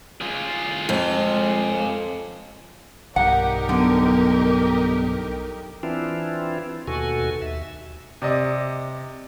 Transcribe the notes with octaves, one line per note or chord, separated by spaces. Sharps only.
F4 G#4
F2 G#3
B1 G2 D#4 G4 A#4 F#5
D3 F#3 B3
E3 C4 D4 E4 F4
D#2 B2 F#4 A4 G#5
D#2 E5
C3 D5 D#5